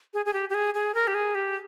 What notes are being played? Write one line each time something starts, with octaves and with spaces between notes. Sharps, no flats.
G#4
G#4
G4
G4
G#4
G#4
A#4
G4
G#4
G4